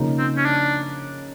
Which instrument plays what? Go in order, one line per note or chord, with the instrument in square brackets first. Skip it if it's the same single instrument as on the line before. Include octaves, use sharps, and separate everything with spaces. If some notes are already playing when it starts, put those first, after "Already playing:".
Already playing: [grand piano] C#3 F3 A#3 D#4
[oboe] C4
C#4
D4